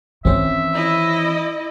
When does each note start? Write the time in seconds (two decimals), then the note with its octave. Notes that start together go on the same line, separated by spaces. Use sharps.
0.25 D#3 E3 C4 C#4 C5 E5
0.74 E4 D#5